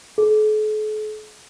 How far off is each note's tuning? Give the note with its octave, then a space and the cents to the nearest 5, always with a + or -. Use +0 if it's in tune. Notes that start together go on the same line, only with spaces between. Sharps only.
A4 -45